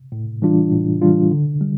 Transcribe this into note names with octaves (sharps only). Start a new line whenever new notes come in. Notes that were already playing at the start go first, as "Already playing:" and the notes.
A2
E3 G3 D4 F4
A2
E3 G3 D4 F4
D3
G3